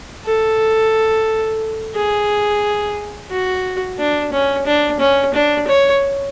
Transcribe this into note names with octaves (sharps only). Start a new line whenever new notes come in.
A4
G#4
F#4
D4
C#4
D4
C#4
D4
C#5